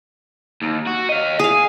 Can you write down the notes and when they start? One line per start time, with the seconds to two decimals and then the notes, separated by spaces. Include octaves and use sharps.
0.62 D#2
0.87 F#4
1.09 D#5 F5
1.39 G#4 F5 G#5